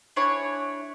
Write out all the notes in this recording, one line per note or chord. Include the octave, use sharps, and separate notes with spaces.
D4 E4 G#4 C#5